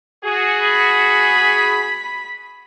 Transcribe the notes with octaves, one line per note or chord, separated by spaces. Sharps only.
F#4 G#4
B5